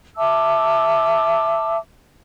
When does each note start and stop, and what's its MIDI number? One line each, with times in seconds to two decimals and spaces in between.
0.17 1.76 76
0.17 1.76 81
0.17 1.76 86
0.17 1.76 88